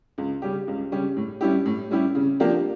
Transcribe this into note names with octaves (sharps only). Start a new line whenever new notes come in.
C#2
C#3 G3 C#4 G4
C#2
C#3 G3 C#4 G4
A2
G3 C#4 E4 G4
A2
G3 C#4 E4 G4
C#3
F3 A#3 D4 G4